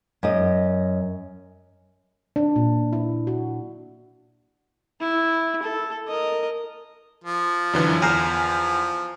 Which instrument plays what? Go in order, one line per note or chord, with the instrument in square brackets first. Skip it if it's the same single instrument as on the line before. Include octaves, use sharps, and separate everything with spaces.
[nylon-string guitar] F#2 D#5
[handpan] D4
A#2
E4
F#4
[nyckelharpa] E4
A4
A#4 D#5
[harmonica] F3
[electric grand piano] F#2 D3 E3
[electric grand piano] E2 [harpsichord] A#4 C5 [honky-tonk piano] G#5